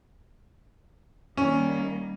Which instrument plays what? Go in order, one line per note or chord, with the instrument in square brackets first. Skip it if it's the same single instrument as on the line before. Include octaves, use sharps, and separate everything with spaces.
[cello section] D#3 G3 A#3 [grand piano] C#4